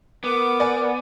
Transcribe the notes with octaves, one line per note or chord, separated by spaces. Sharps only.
B3 A#4 D6
D5 G#5